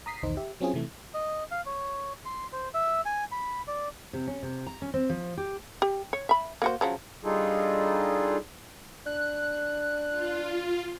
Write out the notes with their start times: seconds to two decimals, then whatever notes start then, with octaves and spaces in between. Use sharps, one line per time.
0.06 A#5 D#6 B6 C7
0.23 B1 E2 D#3 D#4 C5
0.37 G4 E5
0.60 F#3 C4 C#4 F4 G#4
0.74 C3 E3 A3
1.14 D#5
1.51 F5
1.66 C#5
2.26 C6
2.53 C5
2.74 E5
3.06 G#5
3.32 B5
3.67 D5
4.13 C3
4.27 C#4
4.43 C3
4.66 A#5
4.82 C#4
4.94 C4
5.09 F3
5.37 G4
5.82 G4
6.13 C#5
6.29 E5 B5
6.62 A#3 F#4 C5
6.81 C#3 F3 F#3
7.24 G3 D4 D#4 F4 G#4 A4
9.06 D4 F#6
10.10 F4